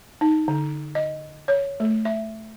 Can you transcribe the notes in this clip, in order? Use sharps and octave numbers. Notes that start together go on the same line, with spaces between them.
D#4
D3
D#5
C#5
A3
E5